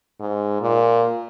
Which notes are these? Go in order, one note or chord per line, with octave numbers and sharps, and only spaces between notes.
G#2
A#2